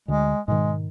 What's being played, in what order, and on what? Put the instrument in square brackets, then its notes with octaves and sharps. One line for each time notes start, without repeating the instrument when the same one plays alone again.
[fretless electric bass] D2 D3 [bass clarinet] G#3
[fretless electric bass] G#2 B2 D#3 [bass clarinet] G#3